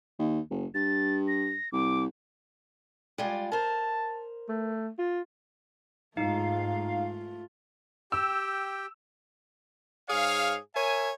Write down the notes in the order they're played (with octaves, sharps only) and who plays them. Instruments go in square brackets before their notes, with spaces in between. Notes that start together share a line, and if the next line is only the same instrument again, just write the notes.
[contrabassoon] D#2
F#1
[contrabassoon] G2 [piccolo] A6
[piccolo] A#6
[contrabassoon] C2 [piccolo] D6
[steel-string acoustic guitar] G3 G#3 F4
[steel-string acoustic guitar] A#4 C5 [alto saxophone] A5
[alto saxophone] A3
F4
[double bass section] G#2 [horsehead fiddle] A3 F4 [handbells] D#4 [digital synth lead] F5
[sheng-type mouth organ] G4 G5 [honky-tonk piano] E6
[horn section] G#2 G#4 C#5 F5
A#4 C#5 E5 G#5